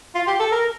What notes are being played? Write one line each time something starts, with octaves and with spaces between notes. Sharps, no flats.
F4
G4
A4
A#4